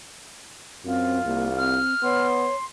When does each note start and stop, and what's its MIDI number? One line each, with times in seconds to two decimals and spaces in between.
0.84 1.22 42
0.84 1.19 60
0.84 1.80 65
1.25 1.79 36
1.25 1.47 58
1.58 1.94 60
1.58 2.26 89
2.03 2.48 59
2.03 2.54 73
2.03 2.65 84